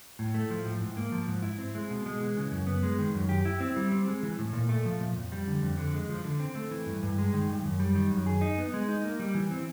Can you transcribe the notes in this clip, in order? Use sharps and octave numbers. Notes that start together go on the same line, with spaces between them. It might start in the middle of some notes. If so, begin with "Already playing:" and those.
A2
A3
F3
A2
G#2
A#3
F3
G#2
E4
C4
G#3
B2
G#3
E3
C#3
F#2
B3
G#3
D#3
F#2
G4
E4
C4
G3
C4
G#3
E3
A2
A#2
A3
F3
A#2
F2
G3
D3
F2
D3
G#3
F3
D3
C4
A3
E3
G2
G2
G#3
D#3
G2
F#2
G3
D#3
F#2
G#4
D#4
B3
G#3
D#4
A#3
G3
E3
C4